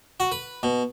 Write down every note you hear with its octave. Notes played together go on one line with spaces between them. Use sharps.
F#4
B4
B2